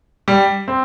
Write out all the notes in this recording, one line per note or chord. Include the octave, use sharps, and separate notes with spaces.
G3
C4